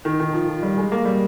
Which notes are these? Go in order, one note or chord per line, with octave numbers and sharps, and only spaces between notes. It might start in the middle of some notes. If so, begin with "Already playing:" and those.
D#3
D#3
F3
F3
G3
G#3
A#3
G3